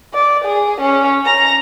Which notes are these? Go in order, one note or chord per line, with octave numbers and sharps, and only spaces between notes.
D5
G#4
C#4
A#5